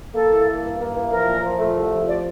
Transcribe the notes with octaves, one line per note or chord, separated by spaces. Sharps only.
A#3 A4
E3
A#3
G2
A#3
E3
F3 A#4
A#2
F3
A3
C2
F3
D5